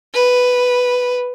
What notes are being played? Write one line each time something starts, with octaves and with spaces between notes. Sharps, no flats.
B4